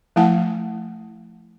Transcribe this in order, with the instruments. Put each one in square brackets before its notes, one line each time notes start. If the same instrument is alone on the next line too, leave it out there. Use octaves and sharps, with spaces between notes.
[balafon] F3 A3 E4 F#5 A5